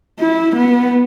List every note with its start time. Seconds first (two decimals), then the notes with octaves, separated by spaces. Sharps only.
0.19 E4
0.56 B3